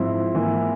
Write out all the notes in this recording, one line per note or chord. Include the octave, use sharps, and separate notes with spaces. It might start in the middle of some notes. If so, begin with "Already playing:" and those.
Already playing: G#2 F3 C4 E4
G#2 E3 A#3 E4